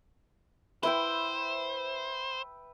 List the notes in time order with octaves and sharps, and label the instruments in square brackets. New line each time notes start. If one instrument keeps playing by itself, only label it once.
[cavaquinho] E4 [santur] B4 E5 G5 [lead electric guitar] C5